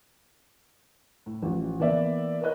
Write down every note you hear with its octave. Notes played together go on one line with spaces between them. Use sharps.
A2
A1 F3
E3 A#3 B3 D5 E5
A#4 B4 C#5 D#5 F#6